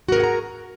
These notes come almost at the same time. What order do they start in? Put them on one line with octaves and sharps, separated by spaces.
F#4 A#4 G#4 F#5 A#5